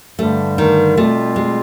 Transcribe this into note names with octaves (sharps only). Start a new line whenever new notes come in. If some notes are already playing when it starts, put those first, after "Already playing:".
G2 D3 G3 A3
D#3
B2 G3 A3 C4 F4
G#3